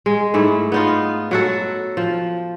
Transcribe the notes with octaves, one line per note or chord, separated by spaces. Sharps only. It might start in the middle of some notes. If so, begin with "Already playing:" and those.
G#3
G#2 A3 E4
B3 D#4 F4
F#3 F#4 A4
F3